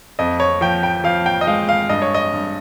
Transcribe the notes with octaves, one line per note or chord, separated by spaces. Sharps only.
F2 D#5
C#5
F3 G5
G5
F3 F5
G5
D#5
G#3 F5
F5
G2 D#5
C#5
D#5
G2